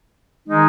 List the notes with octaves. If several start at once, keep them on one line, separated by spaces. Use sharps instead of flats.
D#3 G#3 D#4